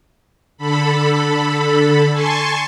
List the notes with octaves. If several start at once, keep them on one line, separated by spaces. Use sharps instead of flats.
D3 A4 B5
G#5 A5 C6 C#6